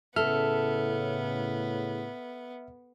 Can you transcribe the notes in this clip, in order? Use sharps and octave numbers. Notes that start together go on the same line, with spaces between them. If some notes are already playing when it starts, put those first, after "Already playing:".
A2 C#3 B3 A4 E5 F6